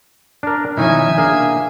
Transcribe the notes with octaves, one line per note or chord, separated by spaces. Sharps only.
D4 A#4
B2 D#3 F3 C#4 D#4 E4 E5 G#5
A#3 D4 G#4